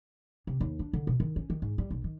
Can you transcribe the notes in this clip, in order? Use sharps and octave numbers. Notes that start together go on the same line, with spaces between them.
C3
D#2
D4
D3
B2
D#3
C#4
D#3
G#2
G3
B1
D#3